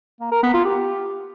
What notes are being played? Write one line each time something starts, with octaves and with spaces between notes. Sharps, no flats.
A#3
A#4
B3
F4
G4